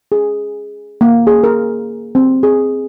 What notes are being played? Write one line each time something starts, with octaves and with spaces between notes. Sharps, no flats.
G#4
A#3
G#4
A#4
C4
G#4